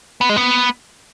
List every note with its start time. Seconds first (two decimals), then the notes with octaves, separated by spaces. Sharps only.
0.21 B3
0.29 G#3
0.36 B3